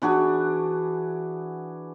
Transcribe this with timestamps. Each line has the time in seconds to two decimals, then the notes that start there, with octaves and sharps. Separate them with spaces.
0.02 E3 D4 F#4 G#4